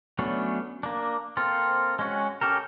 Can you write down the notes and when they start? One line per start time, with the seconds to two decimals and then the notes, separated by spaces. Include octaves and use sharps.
0.19 F#3 A3 B3 C#4 D4
0.83 A#3 D4
1.37 A#3 C4 F4 A4
1.99 G#3 C#4 F#4
2.41 C#4 G4 A4 A#4